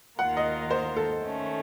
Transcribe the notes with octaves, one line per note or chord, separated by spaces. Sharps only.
D#2 D#3 A#3 F4 A#4 F#5
D#5
C5
A4
D#3 A3 C#4